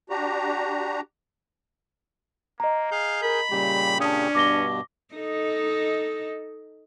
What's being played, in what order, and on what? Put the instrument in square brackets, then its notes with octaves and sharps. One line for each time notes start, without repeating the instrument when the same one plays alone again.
[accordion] D4 F#4 G4 A#5
[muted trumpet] A#3 [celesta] D#5 A#5
[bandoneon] G#4 G6 [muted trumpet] F5
[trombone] A#4 [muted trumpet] B5
[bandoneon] A#2 C#3 G4 [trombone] G3
[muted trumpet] C#4 [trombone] D4 [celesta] A5 D#6
[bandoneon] G2 B2 [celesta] D6 A#6 G7
[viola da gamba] D#4 A4 D#5